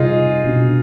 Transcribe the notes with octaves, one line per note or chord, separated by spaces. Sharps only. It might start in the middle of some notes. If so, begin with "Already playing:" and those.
Already playing: C3 G3 D#4 F4 G#4
B2 B3 D4